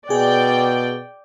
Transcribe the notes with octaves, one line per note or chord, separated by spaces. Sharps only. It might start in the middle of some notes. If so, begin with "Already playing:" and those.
B2 G#4 D5 G5